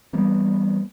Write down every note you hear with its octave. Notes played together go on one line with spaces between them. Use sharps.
E3 G3 A#3 B3